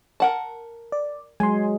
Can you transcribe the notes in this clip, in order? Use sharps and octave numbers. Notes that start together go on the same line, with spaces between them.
A#4 F#5 A5
D5
F#3 G#3 G#5 C6